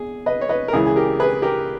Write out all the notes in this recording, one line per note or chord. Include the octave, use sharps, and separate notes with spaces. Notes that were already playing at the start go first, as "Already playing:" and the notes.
Already playing: E2 G#4
B4 D#5
C#5
B4 D#5
A#4
C#2 C#3 E3 E4 G#4
G#4
G4 A#4
G#4 B4
G4 A#4